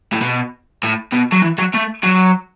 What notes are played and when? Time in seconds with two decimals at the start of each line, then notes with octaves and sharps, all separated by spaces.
0.13 A2
0.22 B2
0.83 A2
1.13 B2
1.32 F#3
1.42 E3
1.58 F#3
1.74 A3
2.03 F#3